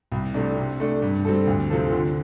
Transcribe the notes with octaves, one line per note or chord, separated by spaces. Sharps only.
C2
C3 A3 D4
C3
A3 D4
G2
G3 C4 A4
D2
C3 F3 C4 A4
D3